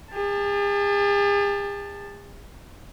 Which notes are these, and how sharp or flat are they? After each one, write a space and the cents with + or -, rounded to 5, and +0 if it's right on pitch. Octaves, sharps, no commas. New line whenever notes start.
G#4 -45 A5 +0